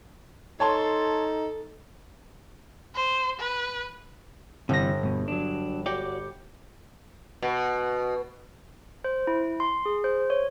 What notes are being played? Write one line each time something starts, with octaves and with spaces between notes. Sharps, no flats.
D#4 A4 C#5 A5 C6
C5
B4
G1 C3 E3 G3 A#6
G2 B2
F#3 D4
F#4 G4 C#5 D5
B2
C5
E4
C6
G#4
C5
C#5